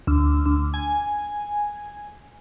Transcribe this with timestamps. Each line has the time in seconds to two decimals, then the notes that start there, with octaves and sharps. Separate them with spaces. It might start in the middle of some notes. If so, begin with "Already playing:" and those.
0.07 D2
0.46 D2
0.74 G#5